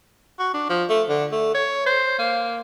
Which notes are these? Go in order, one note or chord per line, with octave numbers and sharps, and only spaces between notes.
F#4
D4
F3
A3
D3
A3
C#5
C5
A#3